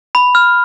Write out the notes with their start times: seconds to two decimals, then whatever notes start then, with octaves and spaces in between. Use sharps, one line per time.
0.15 B5
0.35 F6